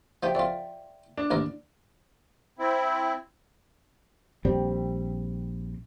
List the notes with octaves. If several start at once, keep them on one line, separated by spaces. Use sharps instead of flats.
F3 D#4 G4 D5 E5 G5
F2 F4 D5 E5 G5
D4
A1 D#2 A#4
C4 E4
A#1 G3 C4